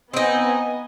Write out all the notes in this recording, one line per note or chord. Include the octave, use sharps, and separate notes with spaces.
B3 C4 D#4 D#5 G#5